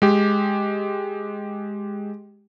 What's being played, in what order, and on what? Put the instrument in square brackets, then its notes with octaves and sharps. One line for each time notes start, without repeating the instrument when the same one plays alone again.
[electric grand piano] G#3 G4